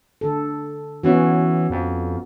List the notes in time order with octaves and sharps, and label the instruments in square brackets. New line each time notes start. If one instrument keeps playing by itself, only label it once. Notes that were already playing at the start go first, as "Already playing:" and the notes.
[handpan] D3 A4
[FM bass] E3 [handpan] B3 C#4 F#4
[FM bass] F2